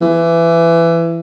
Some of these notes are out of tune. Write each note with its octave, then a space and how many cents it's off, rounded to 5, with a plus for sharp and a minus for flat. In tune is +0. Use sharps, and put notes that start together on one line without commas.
E3 +20